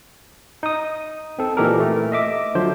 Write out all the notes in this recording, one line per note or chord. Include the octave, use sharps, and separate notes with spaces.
D#4 D#6
C4 A4
A#2 E3 D#4 G4 A4 A#4
A3
D#5 E5 D6
D3 F3 F#3 C5